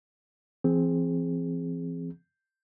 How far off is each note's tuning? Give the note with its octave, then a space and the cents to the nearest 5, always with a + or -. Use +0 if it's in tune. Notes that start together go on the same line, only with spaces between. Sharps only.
E3 +45 C4 +0 G#4 +0